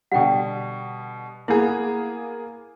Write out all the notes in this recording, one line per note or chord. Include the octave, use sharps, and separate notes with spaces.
B2 D3 G3 F#5 G5
A#3 B3 E4 G#4